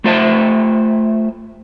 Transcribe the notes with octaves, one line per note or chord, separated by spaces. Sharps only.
A3 F4 C5 E5 A5